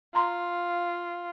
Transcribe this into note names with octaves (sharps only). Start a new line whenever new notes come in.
F4 A#5 C6